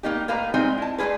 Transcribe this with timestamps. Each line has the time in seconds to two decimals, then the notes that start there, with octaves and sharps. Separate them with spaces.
0.03 A2 E3 A#3 D#4 G4
0.28 A2 A#3 B4 F5 A#5
0.54 A#2 G3 G#3 C4 D#4 E4
0.78 E4 A5
0.98 G#3 A3 D4 F4 G#4 B4